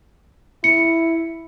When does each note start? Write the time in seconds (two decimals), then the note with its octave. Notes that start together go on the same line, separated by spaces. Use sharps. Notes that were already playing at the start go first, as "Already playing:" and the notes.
0.64 E4 C#7